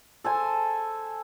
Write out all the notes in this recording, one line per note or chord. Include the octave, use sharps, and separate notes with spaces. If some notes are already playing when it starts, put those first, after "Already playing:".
A4 C5 G#5